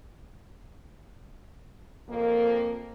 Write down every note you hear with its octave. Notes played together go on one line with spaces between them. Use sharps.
F2 A#3